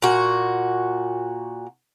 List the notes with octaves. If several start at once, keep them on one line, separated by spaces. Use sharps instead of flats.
A#2 F#4